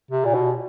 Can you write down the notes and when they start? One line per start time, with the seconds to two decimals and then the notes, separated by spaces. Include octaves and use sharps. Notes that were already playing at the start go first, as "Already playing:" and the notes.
0.11 C3
0.25 A#2
0.34 B2